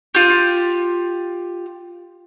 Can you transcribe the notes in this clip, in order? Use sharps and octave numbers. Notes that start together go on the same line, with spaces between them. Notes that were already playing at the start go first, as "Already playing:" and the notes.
F4 G4